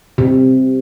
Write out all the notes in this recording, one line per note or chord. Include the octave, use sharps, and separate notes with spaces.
C3